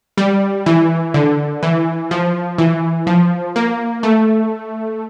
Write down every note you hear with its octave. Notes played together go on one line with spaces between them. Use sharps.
G3
E3
D3
E3
F3
E3
F3
A#3
A3